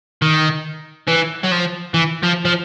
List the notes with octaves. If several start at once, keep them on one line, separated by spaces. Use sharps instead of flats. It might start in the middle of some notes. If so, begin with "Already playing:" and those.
D#3
E3
F#3
F3
E3
F3
F3